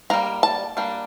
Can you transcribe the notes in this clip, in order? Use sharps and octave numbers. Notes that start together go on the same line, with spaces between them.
G3 A#3 D4 A#5
A5
G3 A#3 D4